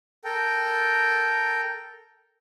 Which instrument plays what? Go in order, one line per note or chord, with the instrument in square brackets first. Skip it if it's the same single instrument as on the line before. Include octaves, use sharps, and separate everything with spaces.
[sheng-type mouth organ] A4 A#4 G5